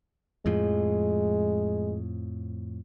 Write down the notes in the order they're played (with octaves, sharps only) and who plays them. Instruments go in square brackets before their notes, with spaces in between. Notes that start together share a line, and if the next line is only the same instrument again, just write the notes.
[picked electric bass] F2 A2 F3 [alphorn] G#3